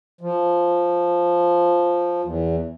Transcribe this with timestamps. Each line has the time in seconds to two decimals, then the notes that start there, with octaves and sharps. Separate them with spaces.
0.21 F3
2.24 E2